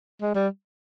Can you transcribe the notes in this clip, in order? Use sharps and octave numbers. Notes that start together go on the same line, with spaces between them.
G#3
G3